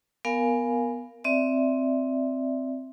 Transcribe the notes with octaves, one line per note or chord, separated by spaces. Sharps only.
B3 A#4 F5 G#5
C4 D5 E5